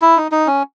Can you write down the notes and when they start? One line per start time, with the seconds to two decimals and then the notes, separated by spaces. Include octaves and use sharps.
0.02 E4
0.17 D#4
0.32 D#4
0.47 C#4